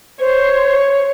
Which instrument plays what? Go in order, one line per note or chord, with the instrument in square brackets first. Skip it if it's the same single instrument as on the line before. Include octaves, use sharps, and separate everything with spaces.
[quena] C5 [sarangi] C#5